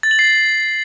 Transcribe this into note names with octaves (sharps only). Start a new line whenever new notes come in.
A6
F#7
C7